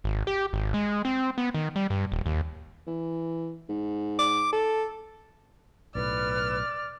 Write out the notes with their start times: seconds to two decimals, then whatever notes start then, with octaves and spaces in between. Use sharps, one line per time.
0.04 G#1
0.27 G4
0.53 G#1
0.74 G#3
1.05 C4
1.38 B3
1.54 D#3
1.76 G3
1.90 G2
2.12 D#1
2.26 D#2
2.87 E3
3.69 G#2
4.19 D6
4.53 A4
5.95 B1 A2 B4 D5 F6